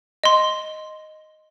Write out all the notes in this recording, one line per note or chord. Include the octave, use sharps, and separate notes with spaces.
D#5 C6